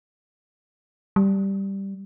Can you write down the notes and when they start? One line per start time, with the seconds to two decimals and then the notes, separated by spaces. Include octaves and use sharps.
1.16 G3